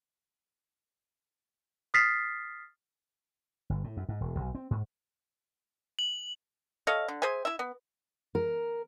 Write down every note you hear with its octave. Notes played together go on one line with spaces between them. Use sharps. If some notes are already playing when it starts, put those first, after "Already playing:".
D#6 F6 A6 B6 C7
G1
A2
F#2
G#2
E1
B1
C4
G#2
F#7
A4 C#5 D#5 F5
D3
G#4 C5 E5 G#5
E4 E5
B3
A#4